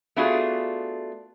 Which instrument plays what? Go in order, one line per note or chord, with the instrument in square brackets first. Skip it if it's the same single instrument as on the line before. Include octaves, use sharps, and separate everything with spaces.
[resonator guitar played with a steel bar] A3 B3 D4 F4 F#4 G#4